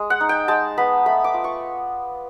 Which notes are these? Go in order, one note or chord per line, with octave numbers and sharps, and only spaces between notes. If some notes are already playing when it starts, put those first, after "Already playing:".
Already playing: G#3
F#5
D#4
G5
G#3 A5
B3 B5
A3 B5
D6
F4
C#6